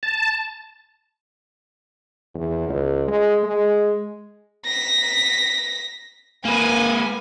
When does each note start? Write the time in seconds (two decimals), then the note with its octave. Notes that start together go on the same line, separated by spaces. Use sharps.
0.03 A5
2.35 E2
2.69 C#2
3.08 G#3
3.43 G#3
4.65 A#6 B6
6.45 A#3 B4 G#5